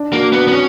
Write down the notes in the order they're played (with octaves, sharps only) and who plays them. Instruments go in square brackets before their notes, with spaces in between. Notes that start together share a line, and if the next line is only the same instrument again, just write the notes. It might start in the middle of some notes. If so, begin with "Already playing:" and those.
Already playing: [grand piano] D4
[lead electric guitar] A#3 [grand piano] F#4
[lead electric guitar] B3 [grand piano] F#4
[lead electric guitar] B3
C#4